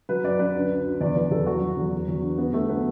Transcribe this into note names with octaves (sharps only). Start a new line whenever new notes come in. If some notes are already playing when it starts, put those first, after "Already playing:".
F#3 B4
F#2 D5
F#2 B4
D2
D2
D2
E2 D5
E2 B4
E2 A4
F#3 F#4
F#3
E2
F#3
E2
D3
D3 B3
D3 A3
F#3 B3